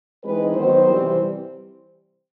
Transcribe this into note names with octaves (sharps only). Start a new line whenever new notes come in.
E3 G#3 C4 D#4 B4
D#3 F#3 B3 D#4 C5
C3 E3 G3 C4